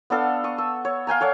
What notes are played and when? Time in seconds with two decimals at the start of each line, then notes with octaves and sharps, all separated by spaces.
0.10 B3 D4 A4 F5
0.44 C#6 D#6
0.58 E6
0.85 C#5
1.07 F5 G5 G#5 A#5
1.21 A4 C#5 D5 F#5